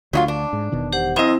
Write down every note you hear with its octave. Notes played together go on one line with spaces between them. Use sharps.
D2 D3 F#3 D#4 F4
D4
G#2
E1 B2 D#3
G4 C5 F#5
F2 C4 E4 C5 D#5